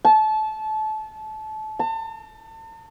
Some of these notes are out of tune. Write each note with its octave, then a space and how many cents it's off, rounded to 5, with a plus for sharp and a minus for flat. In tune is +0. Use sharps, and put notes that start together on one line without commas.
A5 -25
A5 +40